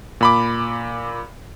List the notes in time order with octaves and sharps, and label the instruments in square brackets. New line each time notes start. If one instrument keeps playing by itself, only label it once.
[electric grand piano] A#2 B5 D6